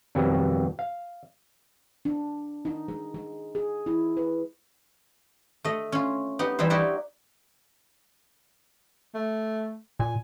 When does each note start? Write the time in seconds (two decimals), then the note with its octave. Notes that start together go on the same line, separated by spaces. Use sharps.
0.15 F2 B2 D#3 F#3 G3
0.79 F5
2.05 D4
2.65 D#4
2.88 G#3
3.14 G#3
3.55 G#4
3.86 E4
4.17 B4
5.64 A3 D#5
5.92 C#4 F4
6.39 B3 D#4 G4
6.59 E3 G3 D#4 E4 C5
6.70 D#4 E4 F#4 G4 D5 E5
9.14 A3
10.00 A#2 G#5